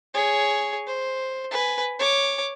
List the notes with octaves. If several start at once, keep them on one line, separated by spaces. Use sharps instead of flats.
G#4 C#5
C5
B4 G#5
C#5 D6